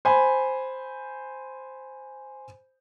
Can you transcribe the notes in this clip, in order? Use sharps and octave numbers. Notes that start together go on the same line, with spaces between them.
C5 G#5 B5